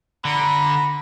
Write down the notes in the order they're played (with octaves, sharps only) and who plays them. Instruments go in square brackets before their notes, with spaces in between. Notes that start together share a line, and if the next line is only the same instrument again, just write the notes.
[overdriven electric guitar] D3 [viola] A#5 [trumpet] B5